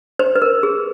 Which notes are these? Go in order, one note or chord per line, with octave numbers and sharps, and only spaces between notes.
C5
B4
A#4
G#4